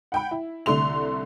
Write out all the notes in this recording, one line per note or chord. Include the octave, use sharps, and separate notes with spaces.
F#5 G5 B5
E4
C2 D3 A3 C6 F7